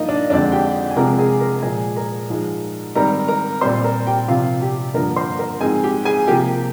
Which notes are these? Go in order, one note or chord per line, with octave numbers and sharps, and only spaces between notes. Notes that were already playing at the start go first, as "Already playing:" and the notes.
Already playing: G2 F3 A#3 D#4 F4 D#5
D4 D5
F2 D3 G#3 C4 D4 D5
G4 G5
G#5
C3 F3 G#3 C4 A#4 A#5
G#4 G#5
A#4 A#5
A#2 F3 G#3 G#4 G#5
A#4 A#5
G#2 F3 G#3
G#2 D#3 G3 C4 A#4 A#5
A#4 A#5
A#2 G3 C4 C5 C6
A#4 A#5
G4 G5
C3 F3 C4 F4 F5
G4 G5
G2 D3 F3 A#3 A#4 A#5
C5 C6
A#4 A#5
G#2 F3 C4 G#4 G#5
G4 G5
G#4 G#5
C3 F3 A#3 G4 G5